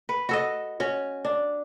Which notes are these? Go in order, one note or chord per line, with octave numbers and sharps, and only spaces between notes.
B4
F#4 A4 D#5
C#4 F#4
D4